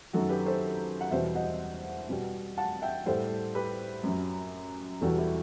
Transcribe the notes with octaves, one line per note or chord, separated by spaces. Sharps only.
F#2 D#3 F#3 F#4 A4
G4 B4
A4 C5
F#5
E2 B2 G3 C5 E5
D#5 F#5
B2 G3
F#5 A5
E5 G5
A2 G3 A4 C5
G4 B4
F#2 F#3
E2 B2 G3 F#4 A4
E4 G4